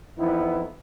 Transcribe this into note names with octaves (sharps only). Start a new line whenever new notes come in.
F2 E3 B3 D#4 E4